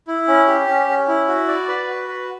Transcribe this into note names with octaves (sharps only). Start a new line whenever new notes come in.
E4
C#4
G4
C#4
C#4
E4
F#4
D5
B4
F#4
B4